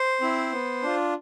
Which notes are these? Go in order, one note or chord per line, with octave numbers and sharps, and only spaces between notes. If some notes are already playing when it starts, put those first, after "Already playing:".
Already playing: C5
C4 E4
B3
D4 F4